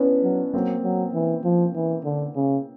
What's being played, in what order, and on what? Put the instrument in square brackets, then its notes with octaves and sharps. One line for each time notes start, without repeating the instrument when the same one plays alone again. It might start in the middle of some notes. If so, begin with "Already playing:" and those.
Already playing: [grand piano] B3 C#4 D4 E4
[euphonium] F#3
[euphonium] F#3 [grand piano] A#3 C4
[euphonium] F#3
E3
F3
E3
D3
C#3